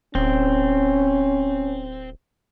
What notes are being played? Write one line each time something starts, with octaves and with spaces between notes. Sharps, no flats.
D1 C4 C#4